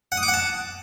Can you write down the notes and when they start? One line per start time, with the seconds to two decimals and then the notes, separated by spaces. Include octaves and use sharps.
0.12 F#5
0.17 D#6
0.23 D6
0.28 F#5
0.34 A5